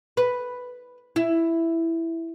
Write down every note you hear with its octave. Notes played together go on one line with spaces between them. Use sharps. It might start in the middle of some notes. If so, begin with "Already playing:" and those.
B4
E4